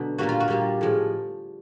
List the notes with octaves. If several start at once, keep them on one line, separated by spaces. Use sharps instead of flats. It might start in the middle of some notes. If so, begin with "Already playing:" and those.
Already playing: B2 D3 F#3
A#2 G3 A#3 F#4
F4
F#4
A#2 G3 A#3 G4
A2 F3 G#3